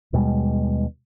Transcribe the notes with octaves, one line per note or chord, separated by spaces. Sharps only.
D#2 B2 G3 G#3